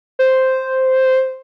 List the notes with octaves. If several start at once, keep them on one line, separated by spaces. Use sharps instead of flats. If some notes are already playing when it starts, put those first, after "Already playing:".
C5